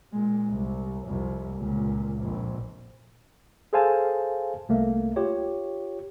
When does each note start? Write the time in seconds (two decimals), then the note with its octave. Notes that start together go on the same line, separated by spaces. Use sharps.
0.12 A#2 G#3
0.48 C2
1.06 C2 F2
1.55 C#2 A#2
2.21 A#1 F2
3.73 G#4 A4 C5 F5 G#5 A5
4.69 C2 A3 A#3
5.16 F4 G4 C#5